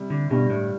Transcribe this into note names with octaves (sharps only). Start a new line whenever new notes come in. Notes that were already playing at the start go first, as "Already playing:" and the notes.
Already playing: C3 G3
D3
G2 B2 D3 G3 D4
A2